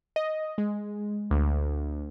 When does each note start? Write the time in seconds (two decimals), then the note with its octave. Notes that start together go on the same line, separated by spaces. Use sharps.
0.16 D#5
0.58 G#3
1.31 D2